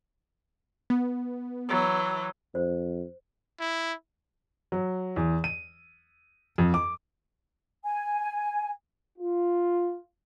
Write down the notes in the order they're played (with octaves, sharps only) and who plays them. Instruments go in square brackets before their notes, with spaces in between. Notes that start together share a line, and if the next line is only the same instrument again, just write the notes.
[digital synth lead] B3
[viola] E3 F#3
[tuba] F2 [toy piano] C5
[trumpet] E4
[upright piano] F#3
E2
D#7
F2
D6
[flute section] G#5
[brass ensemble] F4